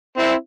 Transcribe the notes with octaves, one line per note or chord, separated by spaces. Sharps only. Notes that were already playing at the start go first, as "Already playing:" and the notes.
C4 E4